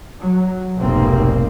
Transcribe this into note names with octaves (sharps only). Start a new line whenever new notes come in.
F#3
F1 B1 G#2 A#3 C4